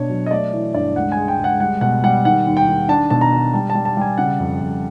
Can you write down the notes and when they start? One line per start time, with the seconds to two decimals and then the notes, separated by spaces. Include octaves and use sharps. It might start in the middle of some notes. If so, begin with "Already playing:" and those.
Already playing: B2 D4 C#5
0.10 F#3
0.26 D#5
0.31 A3 D5
0.53 E3
0.74 G2 D5
0.96 C#2 F#5
1.12 G#5
1.17 G#3
1.28 G5
1.39 C#2
1.44 F#5
1.60 G3 F#5
1.81 B2 F#5
2.04 G3 F#5
2.25 D#3 F#5
2.47 D#2
2.57 G5
2.68 D#3
2.89 D4 A5
3.10 B2 A5
3.21 A#5
3.32 D4
3.53 G3 A5
3.70 A5
3.75 G3
3.85 A5
3.97 G3 G#5
4.18 C#3 F#5
4.40 F2
4.61 F2